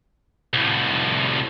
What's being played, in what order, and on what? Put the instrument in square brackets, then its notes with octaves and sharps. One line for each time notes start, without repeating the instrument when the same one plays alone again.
[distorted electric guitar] C2 A2